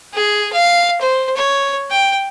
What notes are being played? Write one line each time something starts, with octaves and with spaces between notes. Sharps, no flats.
G#4
F5
C5
C#5
G5